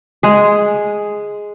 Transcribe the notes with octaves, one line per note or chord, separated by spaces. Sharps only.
G#3 G#4